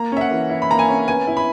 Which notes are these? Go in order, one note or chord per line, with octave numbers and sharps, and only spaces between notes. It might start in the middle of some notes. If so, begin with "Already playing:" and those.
Already playing: A#3 A#5
C#4 E5
F#5
E3
E4
B5
A#3 A#5
G#5
C#4
B3 G#5
E4
B5